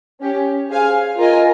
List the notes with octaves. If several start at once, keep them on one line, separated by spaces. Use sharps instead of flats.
C#4 G4 C#5
G#4 C5 F5 G#5
F4 A#4 D#5 G#5